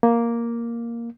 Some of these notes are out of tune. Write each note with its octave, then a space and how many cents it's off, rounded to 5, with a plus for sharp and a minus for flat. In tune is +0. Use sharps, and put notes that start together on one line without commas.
A#3 +5